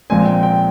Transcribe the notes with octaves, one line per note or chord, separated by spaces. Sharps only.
A#1 A#2 G#3 C4 G#5
G5
G5